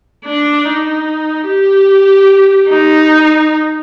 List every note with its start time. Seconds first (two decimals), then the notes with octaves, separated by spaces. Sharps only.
0.25 D4
0.65 D#4
1.47 G4
2.68 D#4